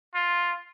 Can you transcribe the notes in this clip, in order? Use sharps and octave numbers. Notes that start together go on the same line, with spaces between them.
F4